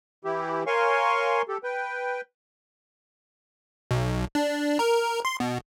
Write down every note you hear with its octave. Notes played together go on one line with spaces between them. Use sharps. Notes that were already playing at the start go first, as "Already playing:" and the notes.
E3 E4 G4
A#4 C#5 F5 G#5 C6 C#6
G4 A4
B4 G5
B1
D4
A#4
C6
B2